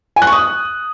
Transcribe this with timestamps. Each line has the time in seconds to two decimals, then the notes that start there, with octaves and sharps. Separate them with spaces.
0.16 G#5
0.22 F#6
0.27 C#6
0.32 D#6